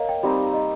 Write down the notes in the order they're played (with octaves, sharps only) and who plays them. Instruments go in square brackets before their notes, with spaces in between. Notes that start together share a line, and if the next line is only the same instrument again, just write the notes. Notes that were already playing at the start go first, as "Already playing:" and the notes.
Already playing: [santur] A#3 [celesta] C#5 D#5 F5
[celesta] G5
[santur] G3 C4 D#4
[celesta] D#5